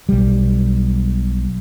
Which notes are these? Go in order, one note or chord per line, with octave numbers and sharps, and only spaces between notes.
B1 G3